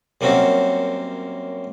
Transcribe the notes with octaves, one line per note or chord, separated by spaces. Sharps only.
F#2 G3 A#3 C4 C#4 F#4